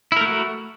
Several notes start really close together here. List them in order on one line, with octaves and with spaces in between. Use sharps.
E4 A#4 A3 F#4